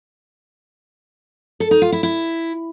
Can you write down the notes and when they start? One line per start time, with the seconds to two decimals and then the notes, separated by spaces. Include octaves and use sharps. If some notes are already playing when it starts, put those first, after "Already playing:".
1.60 A4
1.71 D#4
1.82 F4
1.92 E4
2.03 E4